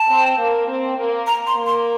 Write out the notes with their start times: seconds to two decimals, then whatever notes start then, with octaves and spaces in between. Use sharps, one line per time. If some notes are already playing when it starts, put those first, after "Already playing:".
Already playing: A5
0.08 C4
0.38 A#3
0.68 C4
0.97 A#3
1.27 A#5
1.47 C6
1.56 A#3
1.66 C6